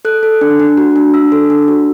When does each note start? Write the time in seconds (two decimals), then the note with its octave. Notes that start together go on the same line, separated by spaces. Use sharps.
0.05 A4 F#6
0.23 A4
0.41 D4
0.60 D4
0.77 F#4
0.96 D4
1.14 D4 E6
1.32 A4
1.50 D4
1.68 F#4